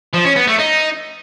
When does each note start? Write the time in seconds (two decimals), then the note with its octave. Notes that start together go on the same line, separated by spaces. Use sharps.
0.13 F3
0.25 C#4
0.36 B3
0.47 A3
0.59 D#4